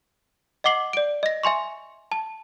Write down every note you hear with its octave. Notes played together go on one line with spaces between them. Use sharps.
D#5 F#5 D6 C7 F#7
D5 D7
D#5 A#6
E5 G#5 C6 C#6
A5